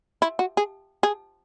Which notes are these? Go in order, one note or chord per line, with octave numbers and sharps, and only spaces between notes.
E4
F#4
G#4
G#4